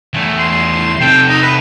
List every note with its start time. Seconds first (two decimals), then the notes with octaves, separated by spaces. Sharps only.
0.14 E2 A3
0.39 C6
1.00 C3 A4 G5
1.28 D#4
1.42 B4